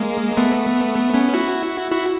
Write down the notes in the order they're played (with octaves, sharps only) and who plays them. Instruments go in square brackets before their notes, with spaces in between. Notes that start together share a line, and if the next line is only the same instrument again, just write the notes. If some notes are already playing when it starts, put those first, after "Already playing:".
Already playing: [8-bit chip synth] G#3 A#3
A3 B3
B3 C#4
E4 F#4
E4 F#4